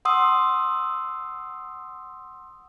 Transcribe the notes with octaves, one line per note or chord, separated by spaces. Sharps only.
F#5 C6 D#6 E6